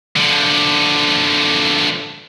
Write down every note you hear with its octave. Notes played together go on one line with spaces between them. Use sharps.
D3 F3